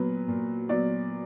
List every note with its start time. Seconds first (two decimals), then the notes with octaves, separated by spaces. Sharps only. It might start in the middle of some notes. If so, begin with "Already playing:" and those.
Already playing: A#2 F#3 B3 B4
0.28 A#2
0.69 F#3 B3 D5